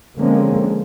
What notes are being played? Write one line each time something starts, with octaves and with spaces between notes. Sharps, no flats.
D3 F3 G#3 A#3 C4 C#4